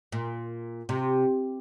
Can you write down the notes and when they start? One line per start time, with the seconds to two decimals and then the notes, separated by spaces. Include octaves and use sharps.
0.12 A#2
0.89 C3